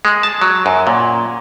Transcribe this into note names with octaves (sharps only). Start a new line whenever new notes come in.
G#3
A5
F#3
F#2
A#2